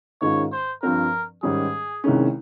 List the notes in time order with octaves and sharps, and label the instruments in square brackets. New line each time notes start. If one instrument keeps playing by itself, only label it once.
[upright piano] G#2 D#3 G#3 C#4 F4 [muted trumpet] C#5
[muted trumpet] C5
[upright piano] G2 F3 C4 [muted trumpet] A#4
[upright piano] G#2 D#3 G3 C#4 [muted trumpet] G#4
[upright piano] C2 C3 D#3 G#3 C#4